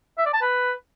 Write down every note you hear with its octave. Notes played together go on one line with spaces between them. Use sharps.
E5
D5
A5
B4